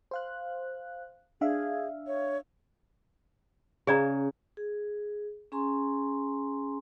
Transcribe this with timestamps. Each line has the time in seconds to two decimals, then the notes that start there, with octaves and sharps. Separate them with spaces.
0.11 C5 F5 F#6
1.41 D4 G#4 E5 F5
2.07 C#5
3.87 C#3 G#4 D5 A#5
4.57 G#4
5.52 C#4 G#4 G#5 A#5 C6